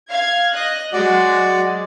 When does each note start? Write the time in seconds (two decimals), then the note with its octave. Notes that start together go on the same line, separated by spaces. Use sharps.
0.11 F5 G#6
0.55 D#5 F#6
0.93 F#3 G#3 F#4 D5